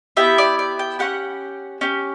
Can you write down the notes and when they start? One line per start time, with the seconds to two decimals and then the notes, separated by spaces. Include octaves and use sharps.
0.17 B3 E4 G4 E5
0.38 D5
0.59 D5
0.79 G5
0.99 C#4 G4 F#5
1.81 C#4 G4